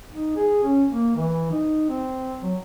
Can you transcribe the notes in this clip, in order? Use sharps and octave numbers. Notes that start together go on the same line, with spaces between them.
D#4
G#4
C#4
A#3
E3
D#4
C4
F#3